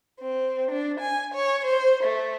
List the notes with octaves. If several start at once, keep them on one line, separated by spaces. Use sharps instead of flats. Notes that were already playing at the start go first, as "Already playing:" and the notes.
C4
D4
G#5
C#5
C5
A3